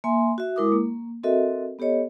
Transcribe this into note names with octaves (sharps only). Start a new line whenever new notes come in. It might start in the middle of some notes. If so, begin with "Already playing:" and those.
A#3 E5 G#5 C6
F#4 E5
G#3 E4 A#4 D6 D#6
A#3
C4 F#4 A4 A#4 D#5 E5
B3 G4 A4 C#5 D#5